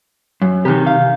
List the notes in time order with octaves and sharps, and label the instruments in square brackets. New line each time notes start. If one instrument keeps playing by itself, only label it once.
[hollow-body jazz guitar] F#2
[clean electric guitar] C3 D#3 [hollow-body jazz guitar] E3 G4
[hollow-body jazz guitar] F5